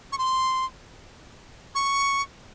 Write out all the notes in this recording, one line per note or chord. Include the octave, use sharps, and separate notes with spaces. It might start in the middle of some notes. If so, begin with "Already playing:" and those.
C#6
C6
C#6